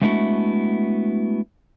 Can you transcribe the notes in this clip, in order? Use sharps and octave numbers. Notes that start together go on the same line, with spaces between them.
G#3 A3 B3 D4 E4 F#4